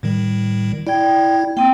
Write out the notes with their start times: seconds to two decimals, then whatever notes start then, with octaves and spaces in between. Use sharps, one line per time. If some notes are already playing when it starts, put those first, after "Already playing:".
0.03 A2 D#3 G3
0.87 E4 D5 G5 G#6
1.57 A#3 C4 G5